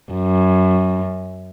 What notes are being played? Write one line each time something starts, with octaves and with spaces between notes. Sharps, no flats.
F#2